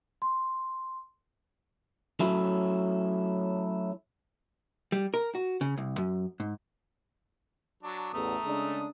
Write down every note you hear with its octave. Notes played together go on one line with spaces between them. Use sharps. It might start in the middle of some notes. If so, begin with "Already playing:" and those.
C6
F#3 A3 C#4 E4
G3
A#4
F#4
C#3
C2
F#2
G#2
F#3 D4
A1 E2 A3 A#5 D#6
C#3 G#3 D4